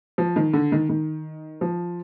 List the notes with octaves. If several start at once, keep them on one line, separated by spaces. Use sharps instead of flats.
F3
D#3
D3
D#3
D#3
F3